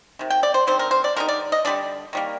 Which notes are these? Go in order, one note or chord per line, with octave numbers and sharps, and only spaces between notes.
C3 D#3
G5
D5
C5
D3 G3 C4 D#4 C5
A#4
C5
D5
D3 G3 C4 D#4 A#4
D5
D#5
D3 G3 D4 D5
D#3 G3 A#3